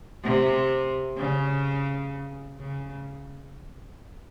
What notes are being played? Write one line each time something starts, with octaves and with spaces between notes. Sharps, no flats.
C3
C#3
C#3